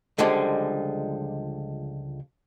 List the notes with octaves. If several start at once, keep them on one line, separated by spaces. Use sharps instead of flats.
C#2 D3 F3 G3 G#3